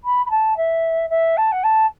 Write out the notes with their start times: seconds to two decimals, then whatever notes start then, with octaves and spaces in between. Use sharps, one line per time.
0.04 B5
0.26 B5
0.30 A5
0.57 E5
1.10 E5
1.37 A5
1.52 F#5
1.64 A5